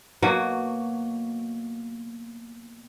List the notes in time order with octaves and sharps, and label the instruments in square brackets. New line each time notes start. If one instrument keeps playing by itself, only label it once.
[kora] B2 F#3 A#3 F#5